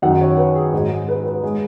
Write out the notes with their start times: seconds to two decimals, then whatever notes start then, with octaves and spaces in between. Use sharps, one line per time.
0.02 F#2 D#3 F#3 F#5
0.21 C#5
0.37 B4
0.55 G#4
0.73 G#2 G#3 F#4
0.91 G#4
1.08 B4
1.26 B4
1.42 G#3 G#4